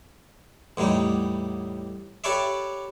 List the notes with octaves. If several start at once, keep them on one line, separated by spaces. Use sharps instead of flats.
E2 A2 G3 D#4
G4 A4 B4 C#5 D5 E5